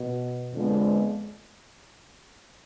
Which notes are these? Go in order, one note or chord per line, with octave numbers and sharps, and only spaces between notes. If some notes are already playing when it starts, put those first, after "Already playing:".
Already playing: B2
F2 D3 F3 G#3 B3